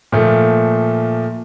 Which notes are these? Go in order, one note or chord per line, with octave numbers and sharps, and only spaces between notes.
A#2 F3 A3